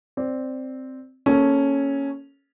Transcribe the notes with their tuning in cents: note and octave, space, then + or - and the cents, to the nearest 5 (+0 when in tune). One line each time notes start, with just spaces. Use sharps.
C4 +0 D5 +0
A#3 +0 C#4 +0 A4 -20